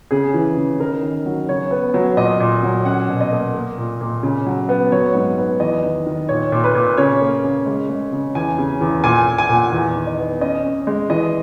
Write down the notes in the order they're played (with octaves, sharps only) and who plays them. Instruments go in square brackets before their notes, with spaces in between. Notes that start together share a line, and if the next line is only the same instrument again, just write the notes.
[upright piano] C#3 G#4
E3
C#3
D#3 A#4
D#3
F#3
C#3 C#5
B3
F#3
A#2 D#5
A#2
F#3
C#4 F#5
B2
D#5
A#3
A#3
A#2
A#2
C#3
F#3
B3
F#3 C#5
G#2
B3
E2 D#5
D#3
D#3
A#2 C#5
A#2
B4
A#2
C#3 C#5
A#3
C#3
G#3
G#3
C#3
E2 G#5
C#3
E2
A#2 G#5
A#2
G#5
A#2
F#5
E2
D#3
D#5
B3
C#4 D#5
C#4
G#3
E3 D#5